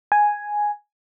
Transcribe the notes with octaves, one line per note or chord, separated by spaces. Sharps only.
G#5